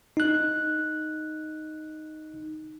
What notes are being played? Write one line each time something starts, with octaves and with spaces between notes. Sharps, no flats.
D#4 F#6